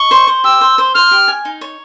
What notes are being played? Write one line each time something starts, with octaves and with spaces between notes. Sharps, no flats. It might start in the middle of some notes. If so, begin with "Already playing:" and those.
Already playing: D#5 C#6
C5
C5
G4 E6
C5
C5
C5 F6
G4
G#5
D#4
C#5